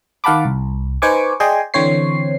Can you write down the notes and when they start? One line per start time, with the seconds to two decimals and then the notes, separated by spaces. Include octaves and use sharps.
0.24 D#3 F5 F#5 A5 B5 D6
0.46 C2
1.02 D#4 B4 C5 G#5 C#6 D6
1.40 G#4 D5 D#5 G5 G#5 C6
1.74 D3 E3 C4 C5 C#5 C7